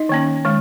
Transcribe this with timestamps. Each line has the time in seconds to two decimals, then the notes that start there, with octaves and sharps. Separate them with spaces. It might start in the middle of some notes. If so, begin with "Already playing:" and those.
Already playing: D#4 D#5
0.09 D#3 A#3 C#4
0.45 D#3 G#3